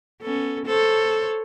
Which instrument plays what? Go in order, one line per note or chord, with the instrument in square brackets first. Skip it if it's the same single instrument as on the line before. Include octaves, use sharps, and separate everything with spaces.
[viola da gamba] B3 C#4 A4
A4 C5 C#5